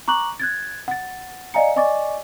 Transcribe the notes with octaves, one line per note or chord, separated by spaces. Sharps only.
A#5 C#6 D6 F#6 F#7
F#6 G#6 A6
F#5 A6
D5 D#5 F5 G#5 A#5 C#7
D5 D#5 G#5 C#6 D6 A6